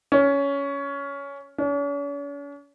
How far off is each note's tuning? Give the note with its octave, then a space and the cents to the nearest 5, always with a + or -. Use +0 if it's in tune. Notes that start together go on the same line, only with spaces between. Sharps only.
C#4 +15
C#4 +45